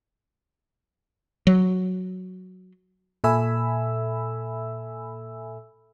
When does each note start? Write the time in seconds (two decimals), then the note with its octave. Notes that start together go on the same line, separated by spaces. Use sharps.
1.47 F#3
3.24 A#2 A4 E5 G#5 B5 E6